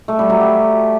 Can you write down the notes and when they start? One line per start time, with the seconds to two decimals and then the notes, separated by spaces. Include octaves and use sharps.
0.08 A3
0.19 G3
0.30 F#3
0.40 G4